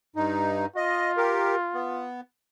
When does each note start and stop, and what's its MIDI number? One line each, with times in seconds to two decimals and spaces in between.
0.16 0.66 43
0.16 0.66 63
0.76 2.07 65
0.76 1.11 75
1.17 1.55 67
1.17 1.55 70
1.74 2.21 59